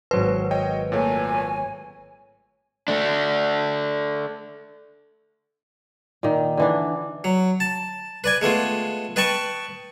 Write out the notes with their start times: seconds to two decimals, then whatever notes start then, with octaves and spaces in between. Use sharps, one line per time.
0.11 G#1 F#3 B4 C5
0.51 C#5 D#5 G5
0.92 A#2 A3 A#3 C#5 G#5
2.88 A3 D4
6.23 A#2 D#3
6.57 D3 E3 D4
7.24 F#3
7.60 A5
8.24 B4 D5 G#5
8.41 G#3 A3 B3 F4
9.16 B4 D#5 G5 A5 B5 C#6